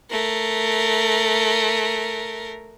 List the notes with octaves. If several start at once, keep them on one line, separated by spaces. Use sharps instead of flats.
A3 A#4